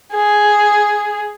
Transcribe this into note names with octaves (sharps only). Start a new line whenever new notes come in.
G#4